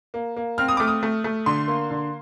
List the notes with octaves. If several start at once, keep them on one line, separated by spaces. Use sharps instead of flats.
A#3
A#3
C4 F6
D#6
A3 D6
D#6
A3
A3
D3 C6
A#3
D3